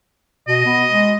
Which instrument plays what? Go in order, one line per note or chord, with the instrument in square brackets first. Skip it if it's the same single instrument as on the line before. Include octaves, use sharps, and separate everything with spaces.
[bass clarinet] B2 [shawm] D#5
[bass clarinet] B3
G#3